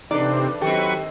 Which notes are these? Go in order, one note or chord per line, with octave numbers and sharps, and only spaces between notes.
E2 C3 C4 D4 D#4 A4 B4 D5
D#3 F#3 C4 G4 A4 B4 G5 C#6